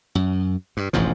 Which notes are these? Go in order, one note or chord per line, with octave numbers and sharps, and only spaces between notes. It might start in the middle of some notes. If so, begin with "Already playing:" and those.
F#2
G2
E1 A1 G#2 F3